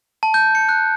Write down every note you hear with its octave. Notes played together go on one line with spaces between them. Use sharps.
A5
G6
C#7
F#6